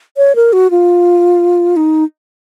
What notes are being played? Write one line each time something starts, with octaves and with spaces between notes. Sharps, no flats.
C#5
A#4
F#4
F4
D#4